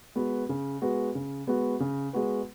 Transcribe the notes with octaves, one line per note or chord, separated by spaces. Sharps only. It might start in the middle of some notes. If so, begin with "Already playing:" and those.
G#3 B3 F#4 B4
C#3
G#3 B3 F#4 B4
C#3
G#3 B3 F#4 B4
C#3
G#3 B3 F#4 B4